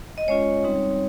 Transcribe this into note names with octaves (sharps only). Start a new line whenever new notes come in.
D#5
G#3 C#4 F4 C#5
G3 C4 D#4